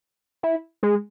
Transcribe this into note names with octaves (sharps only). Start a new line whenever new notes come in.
E4
G#3